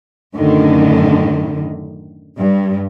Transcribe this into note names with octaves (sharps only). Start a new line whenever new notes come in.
F#2 A2 D3 D#3
G2